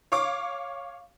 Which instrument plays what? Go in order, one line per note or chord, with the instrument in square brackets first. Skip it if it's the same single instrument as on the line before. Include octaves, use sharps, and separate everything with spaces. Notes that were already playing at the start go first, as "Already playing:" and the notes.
[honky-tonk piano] C#5 F5 C#6 D6